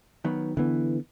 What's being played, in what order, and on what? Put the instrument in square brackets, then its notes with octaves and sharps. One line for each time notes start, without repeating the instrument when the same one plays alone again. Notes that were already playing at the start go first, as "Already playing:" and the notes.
[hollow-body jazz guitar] D#3 F#3 B3
[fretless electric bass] D3 B3 [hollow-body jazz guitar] E3